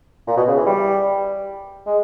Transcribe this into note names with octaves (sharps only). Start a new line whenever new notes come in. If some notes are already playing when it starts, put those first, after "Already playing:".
A#2
B2
C#3
E3
G3
G#3